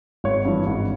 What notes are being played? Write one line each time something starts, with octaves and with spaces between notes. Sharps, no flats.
G#1 C#5
G2 E3
G#1